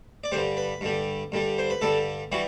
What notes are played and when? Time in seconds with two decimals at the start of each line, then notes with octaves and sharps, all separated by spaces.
0.24 D5
0.32 G2 D3 G3 C5
0.57 B4
0.81 G2 D3 G3
1.32 G2 D3 G3
1.58 C5
1.70 B4
1.81 G2 D3 G3 A4
2.32 E3 G3 F#4